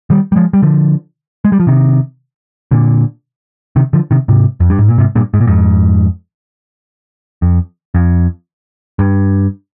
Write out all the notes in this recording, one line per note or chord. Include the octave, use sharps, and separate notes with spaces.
D#3 G3
G3
F3 G#3
G3
D3 F3
G#3
G3
F3
C3 D#3
A#2 D3
C3 D#3
D3 F3
C3 D#3
G#2 C3
F2
G2
G#2
A#2
G#2 C3
G2 A#2
G#2
A#2
F2 G#2
F2
F2
G2